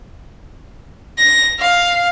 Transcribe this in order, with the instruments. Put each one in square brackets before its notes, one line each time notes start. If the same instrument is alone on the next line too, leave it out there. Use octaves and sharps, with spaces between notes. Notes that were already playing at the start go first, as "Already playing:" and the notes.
[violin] A#6
F5